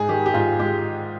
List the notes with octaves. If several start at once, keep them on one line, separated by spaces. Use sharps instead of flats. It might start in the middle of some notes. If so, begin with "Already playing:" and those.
Already playing: G#2 G#4
D#3 G4
G4
G#2 F4
G#3 G4